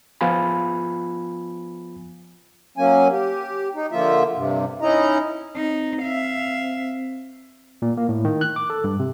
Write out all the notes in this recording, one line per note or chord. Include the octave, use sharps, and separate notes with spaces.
F3 B3 F4 G#5 B5
F#3 A#3 C#4 G#5
G4
D#4
D3 F3 A#3 F4 E5
G2 C3
C#4 D#4 E4 D#5 A#5
C4 D#4
E5 F5
A#2
A#3
A2
D#3
F#6
D6
A4
G2
C3